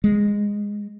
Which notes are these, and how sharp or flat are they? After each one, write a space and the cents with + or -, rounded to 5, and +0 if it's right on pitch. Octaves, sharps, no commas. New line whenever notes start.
G#3 -15